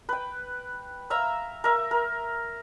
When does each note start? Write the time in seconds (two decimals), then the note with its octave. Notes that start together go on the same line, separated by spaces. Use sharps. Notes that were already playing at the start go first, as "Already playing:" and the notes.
0.09 B4 G5
1.10 E5 F5 A#5 E6
1.64 A#4 E5
1.91 A#4